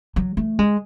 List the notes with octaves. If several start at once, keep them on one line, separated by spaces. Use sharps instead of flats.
F#3
A3
G#3